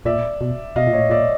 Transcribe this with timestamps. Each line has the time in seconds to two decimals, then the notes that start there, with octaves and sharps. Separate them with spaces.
0.05 A#2 D5 E5
0.41 B2
0.76 B2 D#5 F5
0.87 A#2
0.93 A2 C#5 D#5
1.09 A#2 D5 E5